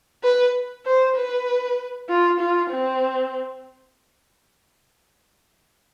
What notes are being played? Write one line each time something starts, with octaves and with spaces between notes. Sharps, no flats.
B4
C5
B4
F4
F4
C4